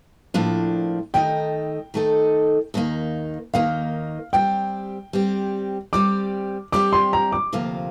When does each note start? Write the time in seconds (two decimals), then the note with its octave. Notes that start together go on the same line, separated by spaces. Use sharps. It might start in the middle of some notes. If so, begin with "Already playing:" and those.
0.34 A2 F3 A#3 D4
1.14 D#3 A3 D#4 A4 D#5 G5
1.94 D#3 A3 D#4 A4 D#5
2.74 D#2 D#3 A#3 D#4
3.53 D#2 D#3 A#3 D#4 F5
4.33 G3 C4 G4 G5
5.13 G3 C4 G4
5.93 G3 C4 G4 D5 D6
6.72 G3 C4 G4 D5 D6
6.93 C6
7.13 A#5
7.32 D6
7.53 D2 C3 F3 A#3 F4